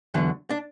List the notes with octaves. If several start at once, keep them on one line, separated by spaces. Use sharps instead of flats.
E2 D3 F#3
D4